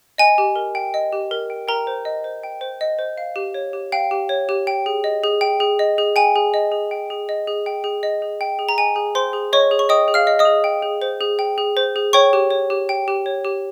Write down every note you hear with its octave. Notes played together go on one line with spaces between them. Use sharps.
D#5 G#5
G4
A#4
G5
D#5
G4
A#4
G5
A#4 G5 A#5
C5
D#5
C5
G5
C5
D#5
C5
F5
G4
C#5
G4
F5 G5
G4
C#5
G4
G5
G#4
D#5
G#4
G5
G#4
D#5
G#4
G5 G#5
G#4
D#5
G#4
G5
G#4
D#5
G#4
G5
G#4
D#5
G#4
G5
G#4
A#5
D#5 G#5
G#4
C5 G5 C6
G#4
C#5 D#5 C#6
G#4
C#6
D#5 G5 D#6
G#4
F5 F6
D#5
D#5 D#6
G#4
G5
G#4
C5
G#4
G5
G#4
C5
G#4
C#5 G5 C#6
G4
C#5
G4
G5
G4
C#5
G4